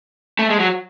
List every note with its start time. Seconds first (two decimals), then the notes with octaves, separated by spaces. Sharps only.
0.39 A3
0.50 G#3
0.60 F#3